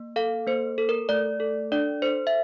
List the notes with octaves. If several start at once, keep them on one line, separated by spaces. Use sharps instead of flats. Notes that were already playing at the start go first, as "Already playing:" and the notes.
Already playing: A#3
A4 F5
A#3 C5
A4
A#4
A3 D5
A4
D4 D5
A4 C5
E5